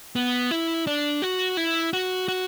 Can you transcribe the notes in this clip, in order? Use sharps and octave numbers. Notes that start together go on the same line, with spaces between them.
B3
E4
D4
F#4
E4
F#4
F#4